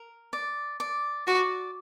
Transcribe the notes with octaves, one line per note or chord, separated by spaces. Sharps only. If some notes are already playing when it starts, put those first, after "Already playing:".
Already playing: A#4
D5
D5
F#4 D5